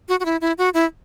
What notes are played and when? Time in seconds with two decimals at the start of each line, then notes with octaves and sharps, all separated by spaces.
0.09 F#4
0.20 F#4
0.25 E4
0.41 E4
0.58 F#4
0.74 E4